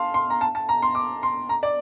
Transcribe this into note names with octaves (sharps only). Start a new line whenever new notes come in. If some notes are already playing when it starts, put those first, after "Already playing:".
Already playing: F5 A5 C6
C6
A#5
A5
A5
A#5
C6
D6
C6
A#5
D5